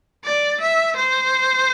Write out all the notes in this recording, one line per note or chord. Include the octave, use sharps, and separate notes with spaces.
D5
E5
C5